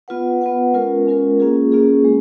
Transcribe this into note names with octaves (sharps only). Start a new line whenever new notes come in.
B3 F4 B4 F#5
B3 F4 B4 F#5
G#3 C#4 F4 A#4
G#3 C#4 F4 A#4
A#3 C#4 F4 G#4
A#3 C#4 F4 G#4
G#3